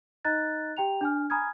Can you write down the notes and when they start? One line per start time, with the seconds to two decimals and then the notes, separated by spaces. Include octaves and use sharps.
0.25 D#4 D#5 A#5 F#6 A6
0.77 G4 G5 A#5 F7
1.01 D4 G#5 F6
1.30 G#5 A#5 B5 D#6 F6 G#6